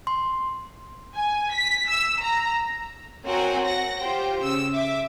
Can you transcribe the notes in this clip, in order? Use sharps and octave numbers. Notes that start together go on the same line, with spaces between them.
C6
G#5
B6
E6
A#5
C4 F#4 A#4 C#5 F#5 G#5
F#5 A#6
F4 G4 C5 G5
C#3 E6
E5 D6